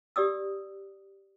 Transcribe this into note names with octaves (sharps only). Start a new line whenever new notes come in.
G4 D5 D#6 E6